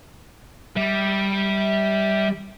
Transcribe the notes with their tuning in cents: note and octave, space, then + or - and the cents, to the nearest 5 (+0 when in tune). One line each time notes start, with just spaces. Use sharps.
G3 +0 E5 -20